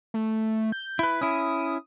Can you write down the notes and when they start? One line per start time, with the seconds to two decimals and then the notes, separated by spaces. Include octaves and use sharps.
0.14 A3
0.72 G6
0.99 E4 B4
1.21 C#4 E4 D#6